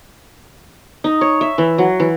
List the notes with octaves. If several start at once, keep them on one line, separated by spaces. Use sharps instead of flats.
D#4
C#5
E5
E3
F#3
E3